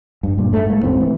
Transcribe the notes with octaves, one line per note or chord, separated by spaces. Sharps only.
G2
G2 A#2
G2 A3
G#2 A#3
E1 A1 A2 C4
E3